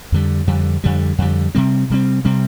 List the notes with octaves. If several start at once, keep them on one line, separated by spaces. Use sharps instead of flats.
F2 D3 G3
F2 D3 G3
F2 D3 G3
F2 D3 G3
C3 G3 C4
C3 G3 C4
C3 G3 C4